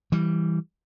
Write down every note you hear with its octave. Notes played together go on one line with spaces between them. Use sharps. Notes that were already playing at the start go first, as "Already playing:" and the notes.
E3 G3